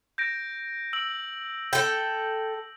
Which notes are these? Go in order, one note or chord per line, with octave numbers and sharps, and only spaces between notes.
G6 A#6 D7
E6 D7 F#7
A4 G5